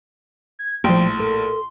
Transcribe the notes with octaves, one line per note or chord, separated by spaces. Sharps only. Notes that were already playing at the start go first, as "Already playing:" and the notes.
G#6
A#1 A2 F3 G5 C6
A4 A#4